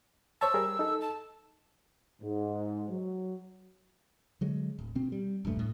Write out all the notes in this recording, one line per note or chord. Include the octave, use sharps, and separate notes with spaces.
C5 C#5 A5 E6
G3 G#4 A#4
D#4 A4
A5
G#2
F#3
D3 F#3 G#3
D1
B2 C4
G3
D#1 B1 G2 A3
A2